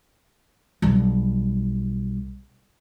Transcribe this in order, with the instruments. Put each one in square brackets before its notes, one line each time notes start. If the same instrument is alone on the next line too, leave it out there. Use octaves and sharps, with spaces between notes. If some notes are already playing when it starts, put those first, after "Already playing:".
[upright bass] B1 G3